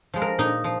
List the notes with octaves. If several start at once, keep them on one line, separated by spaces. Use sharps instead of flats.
F3 G#3
A#4
A#2 D#4
F3